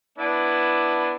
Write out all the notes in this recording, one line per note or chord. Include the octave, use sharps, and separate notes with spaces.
B3 D4 E4